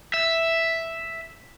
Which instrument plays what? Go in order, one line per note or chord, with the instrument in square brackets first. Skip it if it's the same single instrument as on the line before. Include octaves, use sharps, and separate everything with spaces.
[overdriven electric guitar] E5